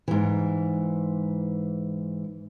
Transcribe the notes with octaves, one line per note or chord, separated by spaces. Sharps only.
G#2 E3